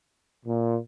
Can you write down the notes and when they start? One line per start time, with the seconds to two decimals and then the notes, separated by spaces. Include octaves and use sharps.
0.46 A#2